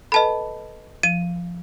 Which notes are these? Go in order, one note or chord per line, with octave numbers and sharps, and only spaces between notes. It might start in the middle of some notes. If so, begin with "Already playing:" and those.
A4 B4 D#5 A5 B5
F3 D#7